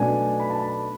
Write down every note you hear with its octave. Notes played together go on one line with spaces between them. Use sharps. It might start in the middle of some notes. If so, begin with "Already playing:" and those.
Already playing: B1 B2 A3 D4 G#5
B5
A5
B5